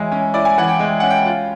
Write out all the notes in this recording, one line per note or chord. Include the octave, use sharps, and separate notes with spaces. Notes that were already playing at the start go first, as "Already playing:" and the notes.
Already playing: E3 G#3 E4 C#5
C#4
E4 D5
G#5
E3 F#5
G5
G#3 G5
C#4 F#5
G5
F4